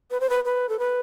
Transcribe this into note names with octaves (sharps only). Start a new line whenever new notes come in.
B4
C5
B4
B4
A4
B4